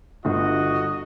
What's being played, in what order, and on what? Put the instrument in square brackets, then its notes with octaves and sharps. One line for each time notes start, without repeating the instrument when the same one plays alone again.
[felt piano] G1 [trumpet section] F#4 D#5